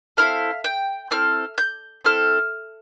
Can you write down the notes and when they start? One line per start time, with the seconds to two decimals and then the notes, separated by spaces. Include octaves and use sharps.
0.17 C4 E4 A4 F5
0.64 G5
1.11 C4 E4 A4 F6
1.58 G6
2.04 C4 E4 A4 F6